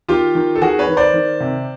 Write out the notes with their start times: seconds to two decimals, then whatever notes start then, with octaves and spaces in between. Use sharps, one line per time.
0.08 D#3 F4 G4
0.35 D#3
0.56 A4
0.62 D#3 F#4 G#4
0.79 B4 C#5
0.88 D#3
0.97 C5 D5
1.14 D#3
1.40 C3